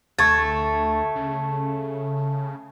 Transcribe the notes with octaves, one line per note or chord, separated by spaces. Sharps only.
D2 A3 C#6 G#6 A6
C#3